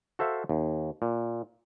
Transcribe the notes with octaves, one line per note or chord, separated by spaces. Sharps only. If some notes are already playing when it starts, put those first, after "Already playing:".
F#4 A4 C5 E5 F5
D#2
A#2